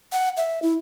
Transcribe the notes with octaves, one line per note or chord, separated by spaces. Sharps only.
F#5
E5
E4